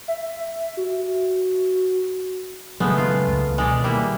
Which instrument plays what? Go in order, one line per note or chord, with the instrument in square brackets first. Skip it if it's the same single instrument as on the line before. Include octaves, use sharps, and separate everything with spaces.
[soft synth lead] E5
F#4
[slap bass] C#3 F#3 [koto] G#3 A3 B3
[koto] F4
[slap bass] C#2
[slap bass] B2 D#3 [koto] G#3 D5
[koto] G3 A#3 E4